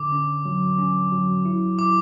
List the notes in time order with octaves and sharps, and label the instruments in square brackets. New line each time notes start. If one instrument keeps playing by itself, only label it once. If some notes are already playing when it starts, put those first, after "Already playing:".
Already playing: [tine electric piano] D3 [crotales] D6
[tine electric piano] C#4
F#3
C#4
F#3
E4
[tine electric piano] E4 [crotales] D6